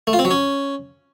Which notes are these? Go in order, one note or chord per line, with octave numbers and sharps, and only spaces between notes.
A3
F4
C4
F#3
C#4